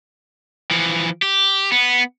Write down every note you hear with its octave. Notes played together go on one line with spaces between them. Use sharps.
E3 F3
G4
B3